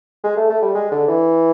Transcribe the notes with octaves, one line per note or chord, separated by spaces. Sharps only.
G#3
A3
A3
G3
G#3
D3
E3